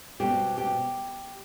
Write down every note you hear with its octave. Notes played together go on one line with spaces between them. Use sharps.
B2 G3 C4 G4
G4